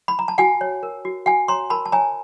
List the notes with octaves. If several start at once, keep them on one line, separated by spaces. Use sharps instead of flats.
B5
A#5
A5
F#4 F#5 G#5
C#5
A#4
F#4
F#4 F#5 G#5
C#5 A#5 C6
A#4 A5 B5
A5
C#5 G#5 A#5